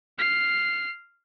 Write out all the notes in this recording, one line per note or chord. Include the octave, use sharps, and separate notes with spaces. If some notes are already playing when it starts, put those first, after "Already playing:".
F6 C7